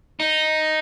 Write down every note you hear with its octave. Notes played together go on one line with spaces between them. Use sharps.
D#4